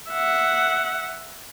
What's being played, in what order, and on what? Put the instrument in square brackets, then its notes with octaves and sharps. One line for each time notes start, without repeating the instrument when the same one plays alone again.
[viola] E5 F#5